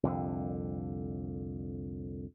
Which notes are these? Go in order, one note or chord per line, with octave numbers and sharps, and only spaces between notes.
C2 F2 D3